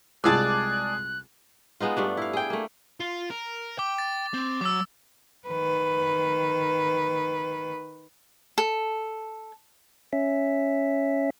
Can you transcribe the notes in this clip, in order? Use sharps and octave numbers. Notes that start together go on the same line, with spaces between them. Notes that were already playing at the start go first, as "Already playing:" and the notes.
C2 G#3 F4 G#4 D5 A5 E6 F#6
G#3 B3 D#4 F4
G2 A3 D4
E4 F5
G#4 G5
A3 A#3
F4
A#4
G5 D6
A6
C4
F#3 D6 E6
D#3 B4
A4
C#4 E5